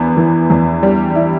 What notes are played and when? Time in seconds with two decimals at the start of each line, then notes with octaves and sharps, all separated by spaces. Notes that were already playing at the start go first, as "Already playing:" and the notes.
Already playing: E2 B3
0.17 E3
0.50 E2
0.83 G3
1.15 E4